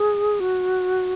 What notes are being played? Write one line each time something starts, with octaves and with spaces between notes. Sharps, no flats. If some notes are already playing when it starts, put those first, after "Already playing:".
Already playing: G#4
F#4